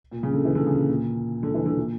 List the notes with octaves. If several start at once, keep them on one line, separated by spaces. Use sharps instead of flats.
A#2
C#3
D3
E3
D3
C#3
A#2
A#2
D3
E3
D3
A#2